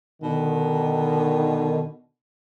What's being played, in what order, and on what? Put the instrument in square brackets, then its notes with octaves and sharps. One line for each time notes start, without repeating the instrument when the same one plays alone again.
[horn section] B2 D3 D#3